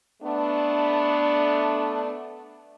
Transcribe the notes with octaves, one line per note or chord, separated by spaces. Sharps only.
A3 B3 D4